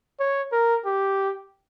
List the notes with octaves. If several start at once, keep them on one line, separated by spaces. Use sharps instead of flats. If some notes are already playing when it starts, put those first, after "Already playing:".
C#5
A#4
G4